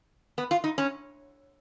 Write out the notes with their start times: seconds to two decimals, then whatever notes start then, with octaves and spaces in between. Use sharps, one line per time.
0.38 B3
0.51 F4
0.64 D#4
0.78 C#4